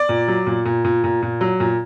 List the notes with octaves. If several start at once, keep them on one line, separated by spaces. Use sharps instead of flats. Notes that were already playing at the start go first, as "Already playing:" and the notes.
Already playing: D5
A#2
F#3
A#2
A#2
A#2
A#2
A#2
F#3
A#2